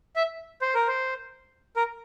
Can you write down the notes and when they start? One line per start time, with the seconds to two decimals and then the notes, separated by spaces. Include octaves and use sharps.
0.16 E5
0.62 C5
0.75 A#4
0.88 C5
1.76 A#4